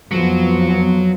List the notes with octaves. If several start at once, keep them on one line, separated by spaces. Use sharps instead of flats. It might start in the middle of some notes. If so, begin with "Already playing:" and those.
F2 F3 F#3 B3